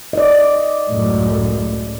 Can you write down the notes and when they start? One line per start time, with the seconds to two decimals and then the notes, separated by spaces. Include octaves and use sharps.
0.13 D5 D#5
0.90 C#2 F#2 A2